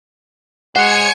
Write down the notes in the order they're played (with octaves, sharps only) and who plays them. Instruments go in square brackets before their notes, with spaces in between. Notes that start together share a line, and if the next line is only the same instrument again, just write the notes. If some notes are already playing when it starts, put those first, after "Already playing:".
[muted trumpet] G#3 [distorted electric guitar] C5 C#5 [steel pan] F#5 [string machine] G#5 G#6 C#7